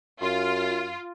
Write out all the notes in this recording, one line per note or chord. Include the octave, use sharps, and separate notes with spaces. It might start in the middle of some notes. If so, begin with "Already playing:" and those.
F#2 F4